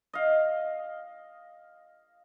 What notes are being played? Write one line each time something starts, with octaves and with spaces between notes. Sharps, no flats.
D#5 F5